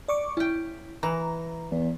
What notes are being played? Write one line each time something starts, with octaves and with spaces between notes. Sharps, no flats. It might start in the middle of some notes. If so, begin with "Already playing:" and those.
D5 C#6 D6
C#4 E4 G5
E3 A#5
E2